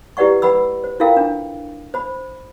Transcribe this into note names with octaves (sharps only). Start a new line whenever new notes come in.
E4 G4 B4 D5 F#5 C#6
B4 F#5 B5 E6
C5
E4 F4 A4 A#4 F5 G5
D4
C5 B5